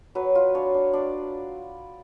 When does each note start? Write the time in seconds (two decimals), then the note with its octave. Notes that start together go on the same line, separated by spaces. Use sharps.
0.15 F#3 B4
0.35 F4
0.55 D4 C#5
0.74 D4
0.93 D4 D5